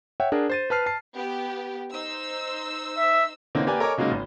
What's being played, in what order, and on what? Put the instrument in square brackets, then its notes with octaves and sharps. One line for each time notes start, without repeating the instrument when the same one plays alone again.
[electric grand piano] C#5 E5 F#5 G5
D4 G#4 A#4 F#5
C5 A6 D#7
B4 A5 F6 C7
A5 C7
[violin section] B3 G4
D#4 C5 E6
[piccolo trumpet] E5
[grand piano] D3 E3 A#3 C4 C#4 D#4
A#3 G4 B4 D5 G#5
A4 A#4 C#5 D#5 G#5 D6
C#3 F#3 G#3 A#3 D#4
G#1